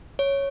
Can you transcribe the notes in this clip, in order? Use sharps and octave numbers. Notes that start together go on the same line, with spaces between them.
C#5